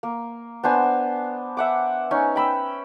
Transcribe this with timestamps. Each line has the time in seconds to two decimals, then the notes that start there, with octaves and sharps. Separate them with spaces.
0.03 A#3
0.63 B3 D4 C5 G#5
1.57 E5 F#5 D6
2.11 C#4 D#4 G#5
2.36 G5 B5 E6